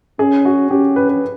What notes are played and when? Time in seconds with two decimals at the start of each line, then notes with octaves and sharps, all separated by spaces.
0.19 C#4 G#4
0.45 F#4
0.71 C#4 G4
0.96 B4
1.09 B4